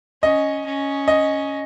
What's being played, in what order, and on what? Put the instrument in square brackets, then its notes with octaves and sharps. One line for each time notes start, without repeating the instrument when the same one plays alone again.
[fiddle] C#4 [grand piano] D#5
[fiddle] C#4
[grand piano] D#5